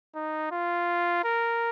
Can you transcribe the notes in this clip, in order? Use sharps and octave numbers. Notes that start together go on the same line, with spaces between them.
D#4
F4
A#4